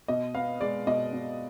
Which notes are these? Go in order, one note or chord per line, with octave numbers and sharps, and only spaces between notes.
B2 D#5
B3 F5
G#3 D5
B2 D#5
B2